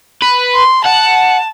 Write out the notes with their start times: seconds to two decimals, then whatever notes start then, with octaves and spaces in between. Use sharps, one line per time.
0.22 B4
0.55 C6
0.85 F#5 A5